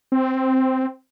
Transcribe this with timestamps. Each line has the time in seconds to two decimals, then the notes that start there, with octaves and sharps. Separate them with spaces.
0.12 C4